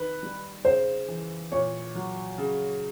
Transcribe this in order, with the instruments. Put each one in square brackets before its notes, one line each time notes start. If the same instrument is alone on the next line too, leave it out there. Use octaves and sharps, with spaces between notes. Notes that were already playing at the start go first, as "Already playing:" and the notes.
Already playing: [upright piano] D#3 [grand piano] B4
[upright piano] G3
[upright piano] C#3 [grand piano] C5
[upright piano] E3
[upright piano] A#2 [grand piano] C#5
[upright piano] F#3
C#3